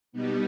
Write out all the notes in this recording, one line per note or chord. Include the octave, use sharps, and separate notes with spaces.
B2 G3 B3 D#4